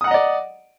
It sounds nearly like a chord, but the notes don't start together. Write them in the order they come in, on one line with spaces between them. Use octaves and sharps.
D#6 F#5 A#5 D#5 D5